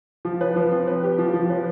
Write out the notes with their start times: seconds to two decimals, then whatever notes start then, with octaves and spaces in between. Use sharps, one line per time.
0.25 F3
0.41 B4
0.56 F3
0.72 C4
0.87 B4
1.03 G4
1.18 F3
1.33 F3
1.50 B4